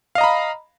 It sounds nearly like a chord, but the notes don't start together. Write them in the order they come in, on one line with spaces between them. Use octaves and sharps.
F5 D#5 A#5 B5